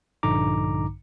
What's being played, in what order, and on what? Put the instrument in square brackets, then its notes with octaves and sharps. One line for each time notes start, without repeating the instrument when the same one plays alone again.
[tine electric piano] A#1 G2 D3 D#4 A#5 D6